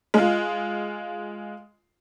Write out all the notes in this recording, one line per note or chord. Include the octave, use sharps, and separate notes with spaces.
G#3 F4